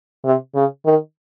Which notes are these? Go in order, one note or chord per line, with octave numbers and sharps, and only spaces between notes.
C3
C#3
D#3